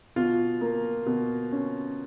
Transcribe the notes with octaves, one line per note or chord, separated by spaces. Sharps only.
B2 F4
A#3
B2
C#4